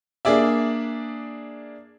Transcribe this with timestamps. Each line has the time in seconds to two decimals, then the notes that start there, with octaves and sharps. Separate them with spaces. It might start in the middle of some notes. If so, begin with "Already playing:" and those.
0.25 A#3 D4 G#4 D5 E5